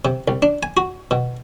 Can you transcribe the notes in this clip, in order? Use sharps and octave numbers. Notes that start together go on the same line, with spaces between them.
C3
C2
D4
G#5
F#4
B2